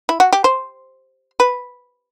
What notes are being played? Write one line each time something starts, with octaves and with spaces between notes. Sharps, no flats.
E4
F#4
G4
C5
B4